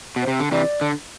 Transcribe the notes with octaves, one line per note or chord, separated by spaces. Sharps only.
B2
C5
C3
D3
C3 E3 D5
D3